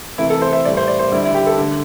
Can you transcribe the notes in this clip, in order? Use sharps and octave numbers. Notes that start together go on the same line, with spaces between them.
C3 E3 A3 E4
A4
C5
E5
A2 G3 D5
C5
D5
C5
D3 G3 E4
E4
G4
A4
D3 A3